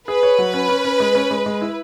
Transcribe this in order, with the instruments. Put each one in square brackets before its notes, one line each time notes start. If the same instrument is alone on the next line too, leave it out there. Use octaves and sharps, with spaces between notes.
[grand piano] G#4 [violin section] B4
[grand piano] C#5
F#3
C#4
C#4
C#4
G#3
C#4
G#3
G#3
E4